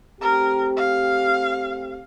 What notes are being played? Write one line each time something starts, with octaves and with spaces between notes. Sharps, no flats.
A3 C4 G4 A#4
F5